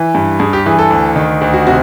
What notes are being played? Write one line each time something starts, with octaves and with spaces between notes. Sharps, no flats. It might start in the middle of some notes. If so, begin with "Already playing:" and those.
Already playing: E3
G2
G2 G#4
G4
E3 G#4
A4
D2
D#3
D2
F#4
C3 F#4